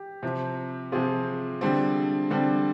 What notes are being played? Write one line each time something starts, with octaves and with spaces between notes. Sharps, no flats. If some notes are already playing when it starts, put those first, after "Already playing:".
Already playing: G4
C3 F3 C4
C3 F3 C4 F4 G#4
D3 G3 C4
D3 G3 C4